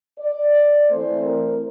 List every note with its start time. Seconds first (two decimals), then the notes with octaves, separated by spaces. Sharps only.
0.20 D5
0.89 E3 A3 C4 C5
1.24 A#4